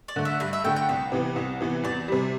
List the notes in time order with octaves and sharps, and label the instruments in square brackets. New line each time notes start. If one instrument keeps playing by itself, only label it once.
[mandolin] D5
[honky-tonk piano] D3 A3
[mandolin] E5
[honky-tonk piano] G2 [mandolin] E5
[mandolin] E5
[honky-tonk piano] D3 A3 [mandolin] G5
[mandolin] G5
[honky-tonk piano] C2 [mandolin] B4
[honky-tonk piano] C3 E3 B3
C2
C3 E3 B3
[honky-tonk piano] E2 [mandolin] D5
[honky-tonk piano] C3 G3